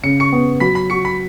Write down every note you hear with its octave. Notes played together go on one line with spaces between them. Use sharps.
C#3 C#7
C#6 C#7
B3
F#3 B5 B6
B5 B6
F#4 C#6 C#7
B5 B6